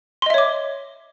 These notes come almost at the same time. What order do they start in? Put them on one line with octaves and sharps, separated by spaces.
C6 D#5 E5 C#5 D6